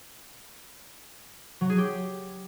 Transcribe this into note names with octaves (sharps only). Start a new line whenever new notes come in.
F#3
G#4
G4